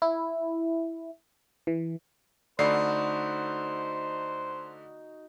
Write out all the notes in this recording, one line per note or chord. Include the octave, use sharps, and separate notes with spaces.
E4
E3
D3 A3 D#4 F#4 C5 D5 B5 C7